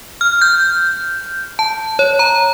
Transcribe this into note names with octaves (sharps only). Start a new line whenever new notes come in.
F6
G6
A5
C#5
A#5